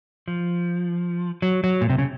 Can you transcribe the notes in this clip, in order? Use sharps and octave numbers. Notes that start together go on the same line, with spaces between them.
F3
F#3
F#3
A#2
C3
C#3